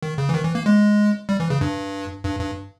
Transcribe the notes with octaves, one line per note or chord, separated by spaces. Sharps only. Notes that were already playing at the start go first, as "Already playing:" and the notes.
D#3
C#3
E3
D#3
E3
A#3
G#3
G3
E3
C#3
G2
G2
G2